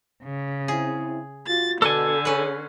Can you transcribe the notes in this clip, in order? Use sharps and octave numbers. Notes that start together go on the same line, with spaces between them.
C#3
C4 E4 G#4
F4 F#4 A6
B2 D3 D4 A4 G#5
C#4 G#4 B4 C#5